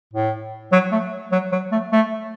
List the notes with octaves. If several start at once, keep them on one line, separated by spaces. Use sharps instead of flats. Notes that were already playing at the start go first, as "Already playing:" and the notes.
A2
F#3
A3
F#3
F#3
A3
A3